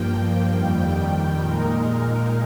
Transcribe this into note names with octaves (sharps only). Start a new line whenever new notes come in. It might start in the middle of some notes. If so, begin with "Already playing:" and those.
Already playing: G2 F3 A#3 G5
F2 D#3 G3 G5
G5
A#2 G#3 D#4 A#4